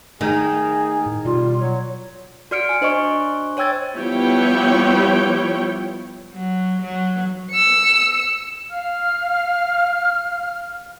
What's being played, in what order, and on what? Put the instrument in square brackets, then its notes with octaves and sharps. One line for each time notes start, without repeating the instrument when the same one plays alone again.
[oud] D#3 [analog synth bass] A3 [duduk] G#4
[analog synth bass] A2
[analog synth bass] B2 [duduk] G3 [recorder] F4
[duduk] F#3 [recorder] C#5
[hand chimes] F#4 D5 F6 C#7 D7
G#5
D4 C5 D#5 G#5 C#6
C5 C#5 G5 E6 G#6 A6
[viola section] F3 G3 B3 E4 C#5 G5
[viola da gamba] F#3
F#3
[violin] E6 C#7
[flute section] F5 F6